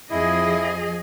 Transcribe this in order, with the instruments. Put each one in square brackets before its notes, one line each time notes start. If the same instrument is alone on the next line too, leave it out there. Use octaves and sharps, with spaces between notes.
[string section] F2 [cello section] F3 G#4 D#5 [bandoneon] E4